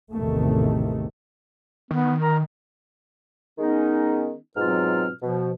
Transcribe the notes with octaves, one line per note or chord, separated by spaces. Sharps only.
A1 E2 A2 C3 D#3 A3
D#3 B3
A#4
D#3 G#3 B3 C#4 D#4
G#2 B2 F#3 C4 F4 F6
B2 F3